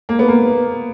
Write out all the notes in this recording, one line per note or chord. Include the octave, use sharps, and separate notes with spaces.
A#3
B3
A#3